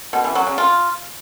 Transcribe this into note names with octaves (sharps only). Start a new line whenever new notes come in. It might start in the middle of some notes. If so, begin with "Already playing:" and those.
B2
E3
F#3
C#3
F4